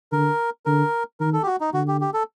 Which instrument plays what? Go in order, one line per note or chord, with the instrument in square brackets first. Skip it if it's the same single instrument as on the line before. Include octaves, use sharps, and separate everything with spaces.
[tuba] D3 [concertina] A#4
[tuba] D3 [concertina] A#4
[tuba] D#3 [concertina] A#4
[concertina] A4
G4
F#4
D#4
[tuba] D3 [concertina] F#4
[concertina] G4
G4
A4